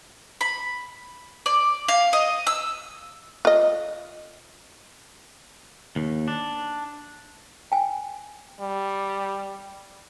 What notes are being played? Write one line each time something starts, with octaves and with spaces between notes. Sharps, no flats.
B5
D5
F5
D#5
E6
F4 D#5
D#2
D4
G5 G#5
G3